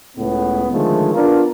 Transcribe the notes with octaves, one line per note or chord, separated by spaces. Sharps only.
C#2 A2 B3
D3 D#3 F3 G#3 A3
B3 D4 F4 A#4